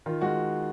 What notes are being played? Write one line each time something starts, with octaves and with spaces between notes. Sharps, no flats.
D#3 F4
G#3 F#4